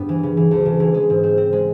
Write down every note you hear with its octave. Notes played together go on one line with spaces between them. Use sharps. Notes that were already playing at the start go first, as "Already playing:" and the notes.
Already playing: G2 G3 B3
E3
C#3
E3
D2
C#3
E3
G#3
G#2
C4
C4
G#3